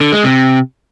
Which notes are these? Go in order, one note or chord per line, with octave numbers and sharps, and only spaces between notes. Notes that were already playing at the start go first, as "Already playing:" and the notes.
D3
G#3
C3